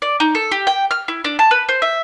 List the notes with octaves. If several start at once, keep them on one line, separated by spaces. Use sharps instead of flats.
D5
D#4
A4
G4
G5
F6
E4
D4
A5
B4
C5
E5